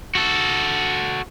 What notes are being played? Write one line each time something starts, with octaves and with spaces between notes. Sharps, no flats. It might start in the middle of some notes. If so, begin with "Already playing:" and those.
F#4 A4